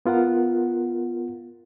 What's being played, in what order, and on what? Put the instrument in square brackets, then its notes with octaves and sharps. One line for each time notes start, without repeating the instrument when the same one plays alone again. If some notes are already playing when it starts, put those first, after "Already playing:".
[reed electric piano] B3 F4 A#4 F#5